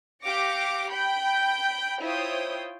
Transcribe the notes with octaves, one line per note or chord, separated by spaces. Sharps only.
G4 F5 D6 A#6 C#7
G5 B5 G6
E4 F4 C5 C#5 G5 D#6